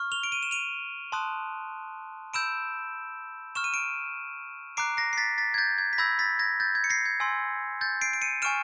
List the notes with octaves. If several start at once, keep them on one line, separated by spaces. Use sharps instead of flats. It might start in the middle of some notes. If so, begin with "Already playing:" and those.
Already playing: C#6 F6
F7 G7
D7
D#7
E7
D#7 F7
A5 C6 D#6 F#6
B5 E6 G6 D7 E7
C#6 F6 E7
D#7
D7 E7
A#5 D6 F#6 C7 D7
A#6 C7
C7
A6 B6
A6 B6
G#6
G6 A6
G#6
B6
B5 E6 G6 G#6 A#6
A6 B6
G#6 A#6
G6 A6
G#6
C#7
A#6 C7
G#6
G#5 C6 E6
G6 A6
C7 D7
D7
C#7 D#7
G#5 C#6 F6 D7 E7